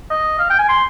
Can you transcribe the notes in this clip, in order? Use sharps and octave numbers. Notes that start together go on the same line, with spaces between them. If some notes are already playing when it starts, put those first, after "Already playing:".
D#5
F5
G5
G#5
C6